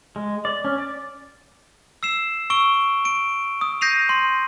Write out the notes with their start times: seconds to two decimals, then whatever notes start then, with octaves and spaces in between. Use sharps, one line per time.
0.16 G#3
0.45 D5
0.65 C#4
0.78 D5
2.03 E6 C7 E7
2.50 C#6 E6 D7 G7
3.05 D7
3.61 D#6
3.81 G6 A#6 C7 D#7 F7
4.09 C6